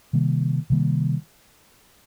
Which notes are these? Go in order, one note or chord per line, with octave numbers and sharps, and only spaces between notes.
C3 D#3 G3 A#3
C3 D#3 G3 A#3